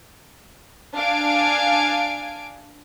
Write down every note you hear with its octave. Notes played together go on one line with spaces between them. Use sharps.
D4 F5 G#5 G#6 D7